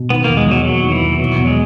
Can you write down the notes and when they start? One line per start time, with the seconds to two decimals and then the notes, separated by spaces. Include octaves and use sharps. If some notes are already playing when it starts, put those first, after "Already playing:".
Already playing: B2
0.10 D#3 B3
0.24 E2 A#3
0.37 G#3
0.47 E2 F#3
0.65 F#3 A#3
0.83 D#3
0.92 E3
1.02 E2
1.19 B2 F#3
1.38 E2
1.47 G#3